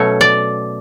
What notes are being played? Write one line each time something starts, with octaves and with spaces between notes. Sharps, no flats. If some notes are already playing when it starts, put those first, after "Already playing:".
Already playing: B2 F#3 A3 C#4 C#5
D5